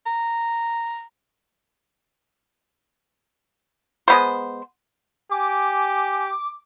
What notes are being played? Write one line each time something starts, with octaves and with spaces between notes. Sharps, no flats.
A#5
G#3 B3 C5
G4 G#5 D6